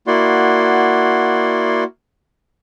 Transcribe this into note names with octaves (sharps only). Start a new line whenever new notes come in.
A#3 E4 F#4 D5 F#5 C6